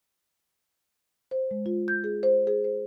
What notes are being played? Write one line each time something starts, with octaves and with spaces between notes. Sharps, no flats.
C5
G#3
F4
G6
G#4
C5
G#4
C5